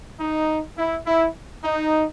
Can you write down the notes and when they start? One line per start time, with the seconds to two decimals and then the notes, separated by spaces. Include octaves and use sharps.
0.20 D#4
0.78 E4
1.07 E4
1.64 D#4